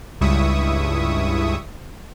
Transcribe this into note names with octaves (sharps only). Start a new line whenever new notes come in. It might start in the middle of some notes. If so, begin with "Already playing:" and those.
C#2 G2 E4 E5 C#6 D#6